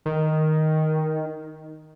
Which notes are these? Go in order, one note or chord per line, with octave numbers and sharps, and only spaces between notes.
D#3